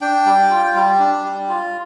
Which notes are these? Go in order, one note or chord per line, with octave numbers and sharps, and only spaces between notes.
D4 G5
G3
F4
G3
D4
G3
F4